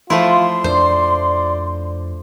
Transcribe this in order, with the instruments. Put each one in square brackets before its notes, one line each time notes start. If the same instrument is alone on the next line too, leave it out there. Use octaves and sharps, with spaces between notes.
[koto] F3 A3 E4 [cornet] F4 [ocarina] C6
[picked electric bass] F2 D4 [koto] C5 [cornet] D5